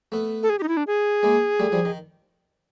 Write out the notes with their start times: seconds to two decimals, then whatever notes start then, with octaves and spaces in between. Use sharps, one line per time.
0.12 A3 B3
0.43 A4
0.50 G#4
0.59 G4
0.63 D#4
0.68 E4
0.77 D4
0.87 G#4
1.23 G#3 A#3
1.60 G3 A3
1.72 F3 G3
1.85 D#3